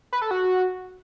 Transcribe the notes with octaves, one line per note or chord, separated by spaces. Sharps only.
B4
A4
F#4